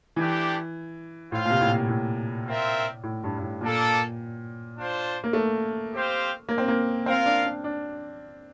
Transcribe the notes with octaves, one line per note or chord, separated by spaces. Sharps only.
E3 A3 D4 G4
A2 F4 C5 F5
A#2
C3
A2
A#2
A2
C4 F4 A#4 E5
A2
G2
G2
A2
A#2 A#3 D4 A4
D4 F4 C5
A#3
A3
C4 G4 C5 F5
A#3
C4
A#3
C4 F4 A#4 F5
D4
D4
D4